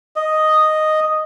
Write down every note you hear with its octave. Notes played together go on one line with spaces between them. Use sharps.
D#5